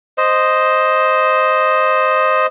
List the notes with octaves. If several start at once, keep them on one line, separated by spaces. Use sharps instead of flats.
C5 D#5